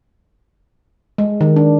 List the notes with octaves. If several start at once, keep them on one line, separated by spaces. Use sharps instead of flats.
G#3
D#3
D4